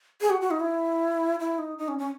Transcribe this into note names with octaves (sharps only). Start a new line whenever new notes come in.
G#4
F#4
F#4
D#4
E4
E4
D#4
D#4
C#4
C#4